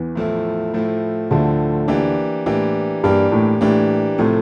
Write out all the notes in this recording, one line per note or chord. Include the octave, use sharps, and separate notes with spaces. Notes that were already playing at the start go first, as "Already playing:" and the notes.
Already playing: E2 E3
A2 F3 A3 E4
A2 F3 A3 E4
D2 A2 D3 F3 A3 E4
E3 A#3 D4 G4
A2 E3 A#3 D4 G4
G2 E3 A#3 D4 G4
A2
A2 E3 A#3 D4 G4
A2 C3 F3 A3